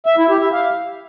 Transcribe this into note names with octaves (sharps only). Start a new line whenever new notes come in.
E5
E4
G4
E5
F5